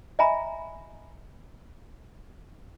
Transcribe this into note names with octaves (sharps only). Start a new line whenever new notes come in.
D#5 E5 G#5 A#5 B5